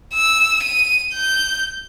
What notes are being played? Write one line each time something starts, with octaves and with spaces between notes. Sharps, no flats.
E6
D#7
G6